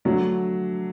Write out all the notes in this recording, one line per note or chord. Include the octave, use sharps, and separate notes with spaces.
D3 F#3 A3 D4